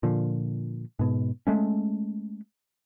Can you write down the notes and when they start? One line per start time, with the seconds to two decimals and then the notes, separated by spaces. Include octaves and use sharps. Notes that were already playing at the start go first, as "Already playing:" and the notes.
0.03 A#2 D3 F3
0.99 G#2 B2
1.47 G#3 A3 C#4